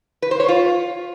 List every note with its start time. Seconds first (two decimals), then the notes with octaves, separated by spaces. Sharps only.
0.22 B4
0.31 C5
0.40 C#5
0.48 F4